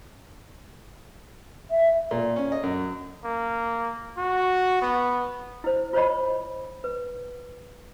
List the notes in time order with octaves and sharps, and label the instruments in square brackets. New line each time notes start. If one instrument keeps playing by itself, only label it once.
[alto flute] E5
[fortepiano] A#2
C#4
D#5
F#2
[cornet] A#3
F#4
B3
[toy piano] E4 C5
F4 C5 C#5 D#5 B5
B4